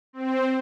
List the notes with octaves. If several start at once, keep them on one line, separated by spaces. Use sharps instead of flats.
C4